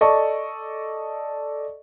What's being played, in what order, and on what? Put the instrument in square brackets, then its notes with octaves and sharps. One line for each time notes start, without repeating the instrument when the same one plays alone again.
[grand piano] A4 D5 D#5 A5 C#6